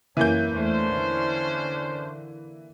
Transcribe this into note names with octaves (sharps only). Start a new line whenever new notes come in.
F#2 E3 A#3 C#4 G#5 G6
E2 A3 C#4 D4 C5
D3